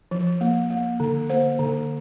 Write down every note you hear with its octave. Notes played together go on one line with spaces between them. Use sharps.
F3
A#3
A#3
D3
A#3 C5
D3